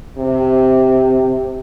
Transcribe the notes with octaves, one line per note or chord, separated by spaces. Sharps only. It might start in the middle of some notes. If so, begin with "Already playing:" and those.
C3